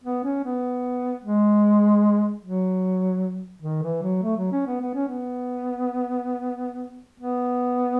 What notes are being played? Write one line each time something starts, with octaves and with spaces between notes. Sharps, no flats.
B3
C#4
B3
G#3
F#3
D#3
E3
F#3
A3
F#3
C#4
B3
B3
C#4
B3
B3